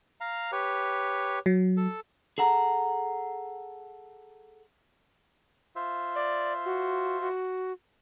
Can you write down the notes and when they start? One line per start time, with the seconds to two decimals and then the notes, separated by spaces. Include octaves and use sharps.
0.21 F5 A#5
0.52 G4 B4 C#5
1.46 F#3
1.77 A4
2.38 G#4 A4 F#5 A#5
5.76 F4 C5 E5
6.15 D5
6.65 F#4
7.21 F#4